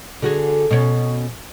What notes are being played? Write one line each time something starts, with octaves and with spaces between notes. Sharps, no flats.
D3 F#4 G#4
B2 C#4